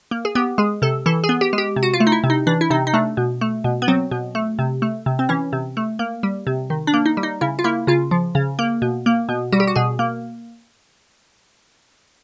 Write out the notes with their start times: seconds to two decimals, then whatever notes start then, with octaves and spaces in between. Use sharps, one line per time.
0.11 A#3
0.25 G#4
0.35 B3 G4
0.58 G#3 G#4
0.82 C3 A4
1.06 E3 A4
1.24 G#4
1.29 B3
1.41 G4
1.53 G#3
1.58 G4
1.76 C3
1.83 F#4
1.94 F4
2.00 A3
2.07 D#4
2.12 E4
2.24 C3
2.30 D#4
2.47 E3 D4
2.61 E4
2.70 C3 D#4
2.87 D#4
2.94 A3 D4
3.17 B2
3.41 A3
3.64 B2
3.82 B3
3.88 F#3 C4
4.11 B2
4.35 A3
4.59 C3
4.82 A3
5.06 C3
5.19 C4
5.29 E3 C#4
5.53 C3
5.77 A3
5.99 A#3
6.23 G3
6.47 C3
6.70 D#3
6.87 D4
6.94 A#3
7.06 D#4
7.17 G3
7.23 D#4
7.41 C#3 E4
7.59 F4
7.64 A#3 E4
7.87 C#3 F4
8.11 F3
8.35 C#3
8.59 A#3
8.82 B2
9.06 A#3
9.29 B2
9.53 G3 F#4
9.60 G4
9.67 F#4
9.76 B2 G#4
9.99 A#3